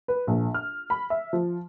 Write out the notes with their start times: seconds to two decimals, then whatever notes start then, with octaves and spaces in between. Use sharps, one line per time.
0.08 B4
0.27 A#1
0.54 F6
0.90 B5
1.10 E5
1.33 F3